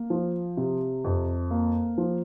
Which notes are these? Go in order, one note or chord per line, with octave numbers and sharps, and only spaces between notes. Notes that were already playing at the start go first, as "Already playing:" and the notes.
Already playing: A#3
F3
C3
F2
A#3
F3